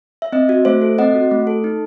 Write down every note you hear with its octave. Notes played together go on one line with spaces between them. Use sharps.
E5
C4 D#5
F#4
A3 C5 E5
A4
C4 D#5 F#5
F#4
A3
A4
D#4